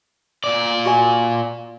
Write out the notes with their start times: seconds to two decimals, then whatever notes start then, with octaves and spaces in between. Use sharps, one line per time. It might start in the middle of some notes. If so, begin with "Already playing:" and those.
0.44 A#2 D5
0.85 F#4 G#5